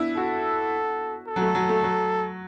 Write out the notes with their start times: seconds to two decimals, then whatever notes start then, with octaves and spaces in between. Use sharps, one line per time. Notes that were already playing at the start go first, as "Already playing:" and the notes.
Already playing: B3 D4 E4
0.17 F#4 A4
1.28 A4
1.36 F#3
1.42 A3
1.55 F#3
1.69 A3
1.83 F#3